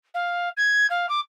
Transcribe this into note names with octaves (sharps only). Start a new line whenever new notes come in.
F5
G#6
F5
D6